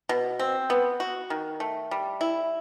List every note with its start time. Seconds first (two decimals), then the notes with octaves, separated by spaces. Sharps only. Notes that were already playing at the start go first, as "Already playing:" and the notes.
0.09 B2
0.39 C4
0.70 B3
1.00 F#4
1.30 D#3
1.60 A3
1.91 G3
2.21 E4